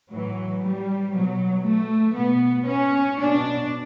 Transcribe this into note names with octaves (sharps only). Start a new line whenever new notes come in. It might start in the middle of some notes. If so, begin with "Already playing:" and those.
A2 E3 F#3
G3
B2 F#3
A3
B2 B3
C#4
B2 D4